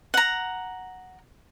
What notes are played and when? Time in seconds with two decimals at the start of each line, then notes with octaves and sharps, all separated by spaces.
0.14 F#5 A#5